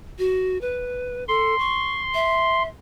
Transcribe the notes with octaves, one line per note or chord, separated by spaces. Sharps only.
F#4
B4
A4 C6
C#6
E5